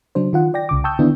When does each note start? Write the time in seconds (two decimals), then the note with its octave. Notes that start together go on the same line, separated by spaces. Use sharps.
0.15 C#3 F#3 D4 C5
0.33 D#3 F4 F#5
0.54 D5 G5 A#6
0.69 C2 C#3 D6
0.84 G5 A5 C#6 D#6 E6 G6
0.99 D3 D#3 B3 D4 E4